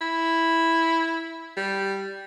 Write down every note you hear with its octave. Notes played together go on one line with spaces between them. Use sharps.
E4
G3